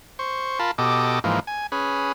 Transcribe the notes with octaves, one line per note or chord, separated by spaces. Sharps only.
C5 C#6
F4 A#4 A5 B5
B2 G4 A4 D#5 D6
G#2 E3 F3 A#3
G#5
C#4 G#4 B4